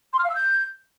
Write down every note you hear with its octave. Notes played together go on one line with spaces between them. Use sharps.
C6
F6
F5
E6
G6